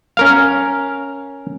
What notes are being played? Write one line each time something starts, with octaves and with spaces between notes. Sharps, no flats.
C#4 A#4 F5